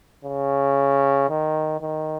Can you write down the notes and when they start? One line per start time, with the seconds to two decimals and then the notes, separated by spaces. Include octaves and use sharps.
0.25 C#3
1.29 D#3
1.81 D#3